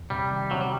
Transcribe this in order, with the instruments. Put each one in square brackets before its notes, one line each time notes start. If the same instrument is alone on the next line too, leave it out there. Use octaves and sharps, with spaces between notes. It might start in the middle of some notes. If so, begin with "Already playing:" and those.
Already playing: [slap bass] E2
[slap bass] C3 [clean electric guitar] G3
[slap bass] D#3
[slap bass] C3 [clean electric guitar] F#3
[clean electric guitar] G3